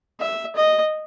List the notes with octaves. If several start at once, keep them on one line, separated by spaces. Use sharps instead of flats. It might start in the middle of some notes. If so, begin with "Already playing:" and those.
E5
D#5